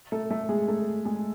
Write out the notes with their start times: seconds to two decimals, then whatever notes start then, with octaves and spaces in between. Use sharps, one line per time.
0.12 A3 A4
0.31 A3 A4
0.49 G#3 G#4
0.68 A3 A4
1.05 G#3 G#4